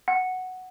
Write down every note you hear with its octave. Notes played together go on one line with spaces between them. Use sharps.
F#5